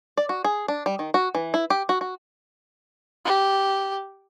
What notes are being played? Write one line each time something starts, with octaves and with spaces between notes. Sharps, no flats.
D5
F#4
G#4
D4
G3
D#3
F#4
E3
E4
G4
F#4
F#4
G4